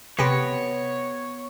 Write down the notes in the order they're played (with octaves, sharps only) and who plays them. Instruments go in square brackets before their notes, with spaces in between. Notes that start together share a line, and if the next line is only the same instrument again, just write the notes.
[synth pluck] C3 G5 A#6 [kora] B3 [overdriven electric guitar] C#5